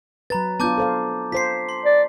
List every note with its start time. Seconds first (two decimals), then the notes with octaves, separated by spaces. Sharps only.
0.30 F#3 B4 A#5 A6
0.60 B3 D4 F4 A5 D6 G6
0.78 A4 C5 F5
1.32 F4 C5 B6 C7
1.69 C6
1.85 D5